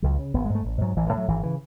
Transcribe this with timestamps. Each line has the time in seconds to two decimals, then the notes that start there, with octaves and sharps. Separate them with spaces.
0.02 C#2 F#3
0.19 C#3
0.34 G#1 B3
0.45 G#3
0.50 G#2
0.55 A3
0.65 A1
0.81 G#2 F#3
0.97 A1 E3
1.07 E3
1.13 A2 F#3
1.28 G#1 E3
1.43 C#3 E3